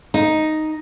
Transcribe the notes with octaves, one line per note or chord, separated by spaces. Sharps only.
D#4